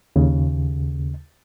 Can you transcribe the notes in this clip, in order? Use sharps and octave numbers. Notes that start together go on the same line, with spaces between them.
D#2 C#3